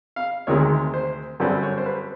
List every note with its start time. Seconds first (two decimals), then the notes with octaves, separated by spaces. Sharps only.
0.16 F5
0.47 D2 C3 D#3 G#3 C#5
0.94 C5
1.40 F#2 D3 G3 C4 B4
1.63 C#5
1.78 C5
1.86 B4